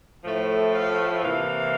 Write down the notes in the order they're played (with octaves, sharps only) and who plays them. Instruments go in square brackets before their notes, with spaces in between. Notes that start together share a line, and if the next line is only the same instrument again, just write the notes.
[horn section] A2 F3 A3
F5
C3 E3 A#3 F5